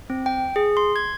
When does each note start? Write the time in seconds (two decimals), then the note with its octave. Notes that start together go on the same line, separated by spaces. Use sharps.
0.10 C4
0.26 G5
0.56 G#4
0.77 C6
0.96 G#6